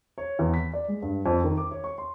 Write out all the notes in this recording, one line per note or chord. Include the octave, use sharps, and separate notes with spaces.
C#5
E2
B6
D5
G#3
G2
F2
D#3
D6
C#5
C#6
C6